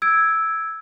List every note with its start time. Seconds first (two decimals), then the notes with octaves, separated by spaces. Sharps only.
0.02 E6 G#6 D7